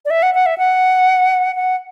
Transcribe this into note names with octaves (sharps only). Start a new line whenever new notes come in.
D5
E5
F#5
F#5
E5
F#5
F#5